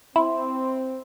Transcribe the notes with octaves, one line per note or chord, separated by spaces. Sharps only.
C4 E4 C6